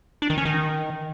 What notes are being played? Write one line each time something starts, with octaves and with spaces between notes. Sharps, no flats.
D4
D#3
C#4
D#3